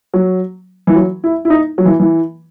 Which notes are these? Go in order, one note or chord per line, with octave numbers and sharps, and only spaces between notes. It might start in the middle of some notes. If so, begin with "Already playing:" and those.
F#3
E3
F#3
E4
E4
D#4
F#3
E3
E3